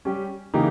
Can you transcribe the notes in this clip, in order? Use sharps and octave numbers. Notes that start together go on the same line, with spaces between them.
G3 C#4 G4
C#3 E3 A#3 D#4 G4